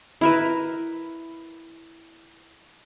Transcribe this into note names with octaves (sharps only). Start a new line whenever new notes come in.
E4 A#4 B4